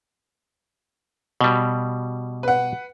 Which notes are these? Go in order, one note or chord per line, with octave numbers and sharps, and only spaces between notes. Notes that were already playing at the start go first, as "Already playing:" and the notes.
B2 G3
B4 F#5